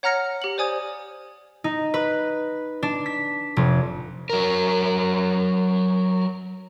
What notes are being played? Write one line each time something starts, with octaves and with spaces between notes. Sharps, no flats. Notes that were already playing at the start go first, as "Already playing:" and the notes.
C#5 F#5 A#5 F6 A#6 C#7
G4 F#7
C5 D5 G#5 D#6 G#6
D#4
B4
D4
B6
F1
F#3 A#4